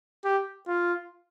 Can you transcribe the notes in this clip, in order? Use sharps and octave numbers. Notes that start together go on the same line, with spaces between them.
G4
F4